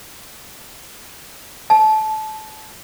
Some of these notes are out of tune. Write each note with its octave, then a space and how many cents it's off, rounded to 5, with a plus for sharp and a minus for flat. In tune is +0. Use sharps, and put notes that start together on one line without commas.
A5 -20